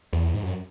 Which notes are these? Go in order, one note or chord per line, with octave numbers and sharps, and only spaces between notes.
E2
G#2
F#2